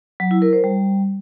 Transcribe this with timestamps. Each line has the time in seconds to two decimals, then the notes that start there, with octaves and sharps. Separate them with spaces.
0.20 F#3
0.31 E4
0.42 A#4
0.53 C5
0.64 G3